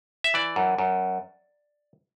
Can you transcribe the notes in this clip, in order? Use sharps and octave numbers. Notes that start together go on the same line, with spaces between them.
E5
E3 D5
F#2
F#2